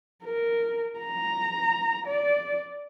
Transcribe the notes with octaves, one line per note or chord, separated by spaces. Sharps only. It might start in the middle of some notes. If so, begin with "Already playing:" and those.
A#4
A#5
D5